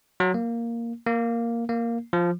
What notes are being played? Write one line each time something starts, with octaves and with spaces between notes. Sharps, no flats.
F#3
A#3
A#3
A#3
F3